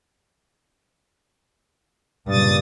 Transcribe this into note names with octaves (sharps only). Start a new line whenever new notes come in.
G2 A#2 C#3 D#6 A6